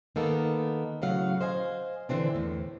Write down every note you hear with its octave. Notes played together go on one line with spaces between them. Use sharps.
D#3 A#3 B3 A4
A2 C#3 F#3 F5 F#5
C5 D#5 F5 G#5
D3 E3 C4 D4
E2 A2